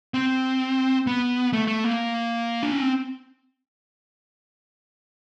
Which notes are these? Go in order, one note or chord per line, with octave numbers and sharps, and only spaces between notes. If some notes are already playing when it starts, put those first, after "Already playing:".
C4
B3
A3
A3
A#3
D4
C#4
C4